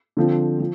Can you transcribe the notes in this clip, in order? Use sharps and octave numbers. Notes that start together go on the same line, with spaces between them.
D3 F3 C4
F3